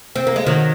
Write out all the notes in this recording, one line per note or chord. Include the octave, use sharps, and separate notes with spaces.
C4
A#3
G#3
D#3 F#3